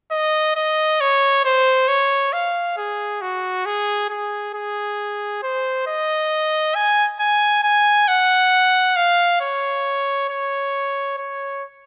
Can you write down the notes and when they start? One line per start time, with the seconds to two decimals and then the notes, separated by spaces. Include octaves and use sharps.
0.12 D#5
0.56 D#5
1.01 C#5
1.45 C5
1.88 C#5
2.33 F5
2.77 G#4
3.22 F#4
3.66 G#4
4.10 G#4
4.54 G#4
5.43 C5
5.87 D#5
6.75 G#5
7.20 G#5
7.64 G#5
8.08 F#5
8.96 F5
9.41 C#5
10.29 C#5
11.18 C#5